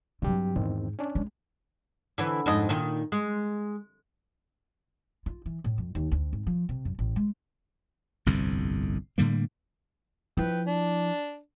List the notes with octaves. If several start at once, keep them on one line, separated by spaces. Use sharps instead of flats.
G2 C3 F#3 G4
E2 G#2 D#3 C4
C#4 D4
G#3
D3 E3
F2 G#2 D#5
A#2 D#3
G#3
F4
E3
A2
F2
D#2
D2
G#1
F3
C3
F#2
A1
G#3
G1 C2 F2 C3
A2 D3 G3 A#3
F3 E4 B4 G5
D4